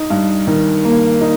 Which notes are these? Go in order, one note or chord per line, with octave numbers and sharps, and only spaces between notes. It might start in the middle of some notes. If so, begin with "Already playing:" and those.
Already playing: D#4
G2
D#3
A#3
D#4